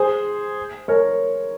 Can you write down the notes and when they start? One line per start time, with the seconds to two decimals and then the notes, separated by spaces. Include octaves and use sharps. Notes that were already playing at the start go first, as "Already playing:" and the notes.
Already playing: G#4 C5
0.88 A#4 C#5